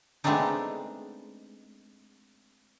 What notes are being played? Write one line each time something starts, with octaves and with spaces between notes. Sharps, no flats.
G#3 A3 B3 C4 D4 D#4